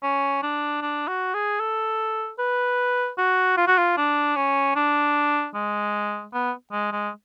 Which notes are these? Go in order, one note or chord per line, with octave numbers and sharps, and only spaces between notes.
C#4
D4
D4
F#4
G#4
A4
B4
F#4
F4
F#4
F4
D4
C#4
D4
G#3
B3
G#3
G#3